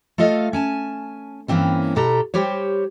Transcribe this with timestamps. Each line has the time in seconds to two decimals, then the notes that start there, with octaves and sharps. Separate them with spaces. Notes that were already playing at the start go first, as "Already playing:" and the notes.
0.18 A3 F4 A4 D#5 F5
0.53 C#4 G#5 A5
1.48 G2 E3 A#3 C4 C#4
1.96 B2 G4 A4 A#5
2.34 G3 G4 C5 C#5